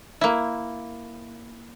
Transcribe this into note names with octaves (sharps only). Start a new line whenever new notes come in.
A#3 E4